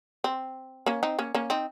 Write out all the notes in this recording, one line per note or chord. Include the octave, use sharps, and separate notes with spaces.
C4
A#3 C#4
C4 D#4
A#3 C#4
A#3 C#4
C4 D#4